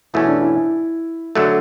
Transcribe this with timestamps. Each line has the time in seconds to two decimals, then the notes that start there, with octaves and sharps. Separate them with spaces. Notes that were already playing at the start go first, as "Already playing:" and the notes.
0.14 E2 B2 A3 C#4 E4
0.27 D4
0.41 E4
1.35 D3 F#3 A3 A4